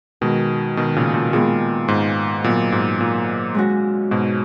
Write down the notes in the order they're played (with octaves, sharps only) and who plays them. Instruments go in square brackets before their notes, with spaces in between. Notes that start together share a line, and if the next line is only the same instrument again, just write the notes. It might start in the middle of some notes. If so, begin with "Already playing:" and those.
[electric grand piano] B2 D#3 [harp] G#3 D#4 F#4
[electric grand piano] B2 D#3
A#2 C#3
A#2
[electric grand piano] A#2 [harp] D#3 G#3 B3 F4 G#4
[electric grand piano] G#2
[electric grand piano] A#2 [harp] F#3 B3 D#4 F#4
[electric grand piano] G#2
A#2
[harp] G#3 C#4 F#4
[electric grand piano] G#2 B2